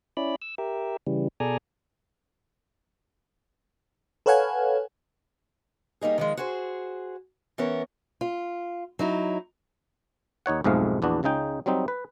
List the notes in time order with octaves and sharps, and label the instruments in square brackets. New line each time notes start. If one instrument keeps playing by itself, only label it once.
[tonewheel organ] C#4 E4 D5 B5
E6
G4 A#4 E5
C#3 E3 G3
B2 G#4 A4 D5 G#5 A#5
[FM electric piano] A4 B4 C#5 F5 F#5 G#5
[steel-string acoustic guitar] G3 A#3 D#4 G#4
D#3 F3 G#3
F#4 G#4 C5
E3 B3 C#4 A#4
F4
F#3 D#4 E4
[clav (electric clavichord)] D#2 D#4 C#5 F#5
B1 F2 G#2 G#3 A3 F5
A#1 E2 B3 D4 F#4
C#2 C#3 G#3 D#4 G5
F#3 G3 C4 D#4
B4